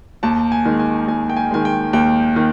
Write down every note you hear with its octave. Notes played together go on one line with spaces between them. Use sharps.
D#2 A5
G#5
D#3 G#3
G#5
D#2 G#5
G5
G#5
D#3 G#3 G#5
G5
D#2 G5
D#3